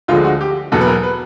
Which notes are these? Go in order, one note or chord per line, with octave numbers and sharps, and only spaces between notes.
D2 D3 F3 G#3 F4
F#4
G4
E2 B2 F#3 A4
B4
A#4
B4